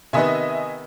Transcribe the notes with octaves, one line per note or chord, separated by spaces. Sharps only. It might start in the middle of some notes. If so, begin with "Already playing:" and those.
C3 D#3 B3 D#5 E5 G#5